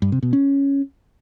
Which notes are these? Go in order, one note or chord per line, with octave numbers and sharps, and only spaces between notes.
G2
C3
B2
C#4